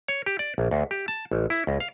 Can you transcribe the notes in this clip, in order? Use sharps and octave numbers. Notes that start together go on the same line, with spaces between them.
C#5
G4
D5
A#1
D2
G4
A5
A1
E4
C#2
F5